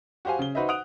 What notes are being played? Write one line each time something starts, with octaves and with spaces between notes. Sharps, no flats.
F#4 G4 C5 F5 G#5
C#3 G7
D#4 F#4 B4 C5 D#5 E5
F#5 D#6 F#6 D7 F7